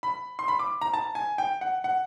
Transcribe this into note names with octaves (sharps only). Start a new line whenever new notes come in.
B5
C6
B5
D6
A#5
A5
G#5
G5
F#5
F#5